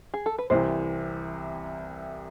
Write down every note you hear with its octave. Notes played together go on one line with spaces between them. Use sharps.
G#4
A4
B4
C2 C3 E3 C5